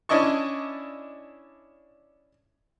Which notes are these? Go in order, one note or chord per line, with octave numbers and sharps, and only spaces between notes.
C#4 D4 E4 D#5 A5 C#6